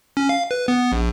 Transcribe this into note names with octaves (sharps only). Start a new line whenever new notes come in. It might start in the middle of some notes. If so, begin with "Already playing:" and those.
C#4
F5
B4
B3
A#1